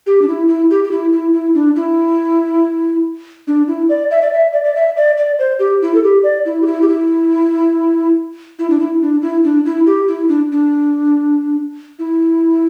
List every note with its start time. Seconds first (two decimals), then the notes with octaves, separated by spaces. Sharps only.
0.07 G4
0.22 D4
0.28 E4
0.48 E4
0.70 G4
0.84 G4
0.91 E4
1.13 E4
1.33 E4
1.55 D4
1.76 E4
3.48 D4
3.68 E4
3.89 D5
4.11 E5
4.22 D5
4.33 E5
4.53 D5
4.64 D5
4.75 E5
4.97 D5
5.17 D5
5.39 C5
5.59 G4
5.82 E4
5.95 A4
6.03 G4
6.23 D5
6.46 E4
6.62 G4
6.66 E4
6.82 G4
6.88 E4
8.59 E4
8.70 D4
8.80 E4
9.02 D4
9.22 E4
9.44 D4
9.65 E4
9.86 G4
10.08 E4
10.29 D4
10.52 D4
11.99 E4